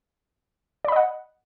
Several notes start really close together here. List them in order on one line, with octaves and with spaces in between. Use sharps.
D5 B5 D#5 F#5